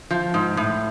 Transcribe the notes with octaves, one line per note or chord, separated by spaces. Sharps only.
F3
G#2
A2